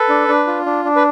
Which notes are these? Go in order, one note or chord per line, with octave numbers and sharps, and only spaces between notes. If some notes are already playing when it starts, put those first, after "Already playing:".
Already playing: A4 B4
D4
D4
F4
D4
D4
B4